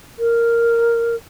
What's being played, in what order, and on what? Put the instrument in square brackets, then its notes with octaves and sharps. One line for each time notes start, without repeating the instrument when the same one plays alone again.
[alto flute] A#4